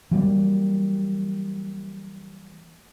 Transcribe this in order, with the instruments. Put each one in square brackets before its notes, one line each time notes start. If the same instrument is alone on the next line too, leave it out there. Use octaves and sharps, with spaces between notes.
[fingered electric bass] E3 F#3 G3 A#3